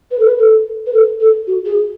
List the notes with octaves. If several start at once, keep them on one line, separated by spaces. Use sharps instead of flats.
B4
A4
B4
A4
B4
A4
A4
F#4
G#4